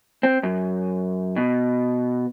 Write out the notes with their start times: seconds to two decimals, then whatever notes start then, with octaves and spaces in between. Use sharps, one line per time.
0.23 C4
0.43 F#2
1.36 B2